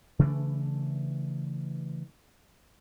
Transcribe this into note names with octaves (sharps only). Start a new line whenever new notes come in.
C#3 E3 A3 D4